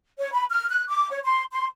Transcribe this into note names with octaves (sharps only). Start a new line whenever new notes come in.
C#5
B5
F6
F#6
D6
C#5
C6
C6